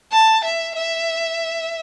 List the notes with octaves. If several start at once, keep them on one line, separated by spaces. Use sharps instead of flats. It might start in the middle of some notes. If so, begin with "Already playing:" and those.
A5
E5
E5